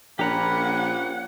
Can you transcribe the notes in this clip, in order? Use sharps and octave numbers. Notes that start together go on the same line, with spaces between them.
A#1 F3 A#3 C#4 G4 F#5 A#5 B5